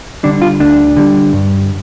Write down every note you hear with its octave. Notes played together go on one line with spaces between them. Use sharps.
D3 G3 D4
F4
D2 D4
D3 G3
G2